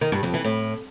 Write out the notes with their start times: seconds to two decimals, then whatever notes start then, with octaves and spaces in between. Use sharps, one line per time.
0.01 D#3
0.12 G2
0.23 F2
0.34 E3
0.45 A2